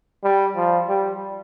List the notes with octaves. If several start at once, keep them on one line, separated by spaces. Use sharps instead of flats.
G3
F3
G3